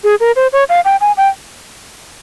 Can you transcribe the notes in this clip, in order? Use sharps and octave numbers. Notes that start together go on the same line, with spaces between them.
G#4
A#4
C5
C#5
F5
G5
G#5
G5